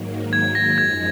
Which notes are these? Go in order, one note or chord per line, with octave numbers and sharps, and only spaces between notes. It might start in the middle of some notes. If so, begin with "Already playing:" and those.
Already playing: G#2 D#3 F#3 A#3
G#6
A#6
F#2 F3 G#3 D#4 G#6